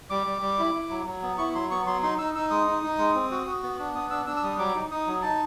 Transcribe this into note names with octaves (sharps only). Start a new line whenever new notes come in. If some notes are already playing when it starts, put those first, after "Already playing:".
G3 D6
G3
G3
E4
E4
F#3
F#3
B3
E4 C#6
F#3 C6
B3 C#6
F#3 C6
D#4 C6
D#4 E6
D#4 E6
G#3 D#6
D#4
D#4
G#3
C4
F#4
F#4
B3
D4
B3 D#6
D4 E6
D4 E6
E6
G3 D#6
F#3 D6
D#4
D#4 D#6
F#3
D#4 A5